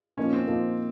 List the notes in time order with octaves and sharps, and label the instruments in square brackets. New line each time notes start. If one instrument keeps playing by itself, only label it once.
[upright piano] A#2 F3 A#3 D#4 [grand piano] C#4
[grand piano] C4
[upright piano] A#2 F3 A#3 D#4